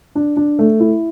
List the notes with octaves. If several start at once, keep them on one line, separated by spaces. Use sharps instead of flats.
D4
D4
A3
E4